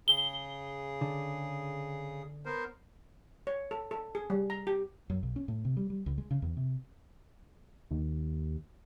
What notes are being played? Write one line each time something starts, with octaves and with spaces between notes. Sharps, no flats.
C#3 G#4 G7
D3
B3 A#4 C5
C#5
A4
A4
G#4
G3
A#5
G4
F#2
B1
C#4
A2
C3
G3
G3
C#2
G#3
C#3
E2
C3
D#2